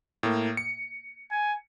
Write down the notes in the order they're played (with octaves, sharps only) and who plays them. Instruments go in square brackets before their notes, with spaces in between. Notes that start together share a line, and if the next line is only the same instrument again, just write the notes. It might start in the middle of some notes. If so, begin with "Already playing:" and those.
[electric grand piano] A2 A#3
C#7
[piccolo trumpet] G#5